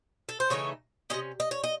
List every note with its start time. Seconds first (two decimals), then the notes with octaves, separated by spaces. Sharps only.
0.29 A4
0.40 C5
0.50 C#3 E3 A3 D#4 C#5
1.10 F#3 C#4 D#5
1.14 C3
1.40 D#5
1.51 C#5
1.64 D#5